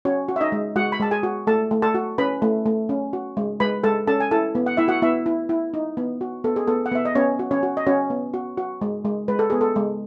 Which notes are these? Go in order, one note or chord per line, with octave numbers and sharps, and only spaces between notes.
C#4 F#4 C#5
F#4
E5
D#4 D#5
G#3
G#3 F#4 F#5
B5
G#3 A5
G#4 G#5
F#4
A3 A4 A5
A3
A4 A5
F#4
C#4 B4 B5
A3
A3
C#4
F#4
G#3
G#3 B4 B5
G#3 A4 A5
C#4 A4 A5
G#5
E4 A4 A5
B3
F#5
E4 E5
F#4 F#5
B3 E4 E5
E4
E4
D#4
B3
F#4
B3 A4
G#4
B3 A4
F#5
B3 E5
D#5
B3 C#4 C#5
F#4
C#4 C#5
F#4
D#5
C#4 F#4 C#5
B3
F#4
F#4
G#3
G#3
G#3 B4
A4
B3 G#4
A4
G#3